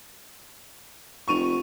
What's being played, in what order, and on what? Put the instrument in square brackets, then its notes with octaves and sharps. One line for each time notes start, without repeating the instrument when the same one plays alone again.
[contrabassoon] F1 [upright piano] C#6 D#7 F7